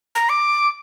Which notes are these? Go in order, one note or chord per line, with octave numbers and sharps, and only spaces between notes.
A#5
D6